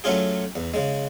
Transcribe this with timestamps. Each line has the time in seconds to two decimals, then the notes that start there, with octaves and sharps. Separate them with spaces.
0.04 F#3 A3 C#4 F4 G#4
0.56 E2
0.74 C#3 G#3